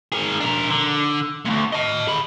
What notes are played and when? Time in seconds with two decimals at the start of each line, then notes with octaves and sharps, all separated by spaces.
0.12 G#4 A#4
0.40 D4 A#4
0.70 D3
1.46 D2 A#2
1.73 D#5 A5
2.07 G#4 B5